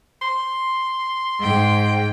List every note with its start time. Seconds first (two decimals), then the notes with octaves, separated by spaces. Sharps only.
0.21 C6
1.40 G#2 G5